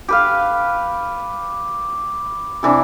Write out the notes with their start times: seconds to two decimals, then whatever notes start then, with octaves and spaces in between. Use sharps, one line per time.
0.09 G4 B4 F5
2.63 C3 E3 D4